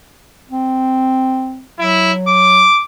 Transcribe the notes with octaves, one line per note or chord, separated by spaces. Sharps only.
C4
F#3 E4
D6